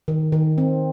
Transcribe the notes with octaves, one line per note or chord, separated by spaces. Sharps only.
D#3
D#3
C4